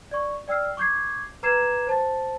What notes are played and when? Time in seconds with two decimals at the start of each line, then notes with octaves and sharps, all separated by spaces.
0.11 D5 C#6
0.48 D5 G5 E6 F6 C7
0.77 C#6 D6 G6 G#6 C7
1.43 B4 A#5 D6 G#6 C7 E7
1.87 C5 A5 A6